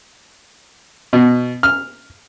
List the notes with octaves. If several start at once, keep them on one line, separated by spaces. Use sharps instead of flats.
B2
F6